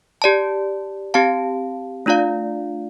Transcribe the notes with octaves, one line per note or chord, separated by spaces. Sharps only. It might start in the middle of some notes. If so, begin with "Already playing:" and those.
G4 D5 A5
C4 G4 F5 A5
A3 D4 F4 D5 F5